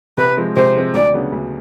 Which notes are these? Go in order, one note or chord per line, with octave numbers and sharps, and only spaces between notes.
C3 B4
F3 G#3 C4
C3 C5
F3 G#3 C4
D2 D5
C#3 F#3 B3 D4
D2